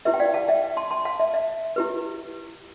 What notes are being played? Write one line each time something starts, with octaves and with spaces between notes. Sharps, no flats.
E4 G4 B4 E5
G5
D5 F5
F5 A5
E5 G5
A5 C6
A5 C6
F5 A5
E5
E5
E4 G4 B4